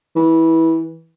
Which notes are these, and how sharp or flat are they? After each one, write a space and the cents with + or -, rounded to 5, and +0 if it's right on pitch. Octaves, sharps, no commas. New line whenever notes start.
E3 -20